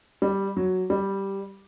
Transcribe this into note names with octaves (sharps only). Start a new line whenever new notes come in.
G3
F#3
G3